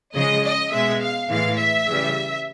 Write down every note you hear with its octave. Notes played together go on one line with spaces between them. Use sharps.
C#3 F3 G#3 D#5
D#5
B2 G#3 E5
F5
A2 E3 G#3 F5
E5
C#3 E3 G3